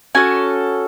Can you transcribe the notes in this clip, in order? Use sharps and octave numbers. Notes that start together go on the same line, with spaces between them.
C#4 F#4 A4 G#5